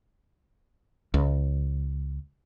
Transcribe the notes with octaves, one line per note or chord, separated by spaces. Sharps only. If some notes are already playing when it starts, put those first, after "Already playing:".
C#2